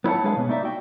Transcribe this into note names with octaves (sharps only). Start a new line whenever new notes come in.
B3 E4 C#5 F#5 A5
G#3 D4 G#4 B4 C#5 F5
B2 B3
A3 D#4 D5 E5
F#4 G5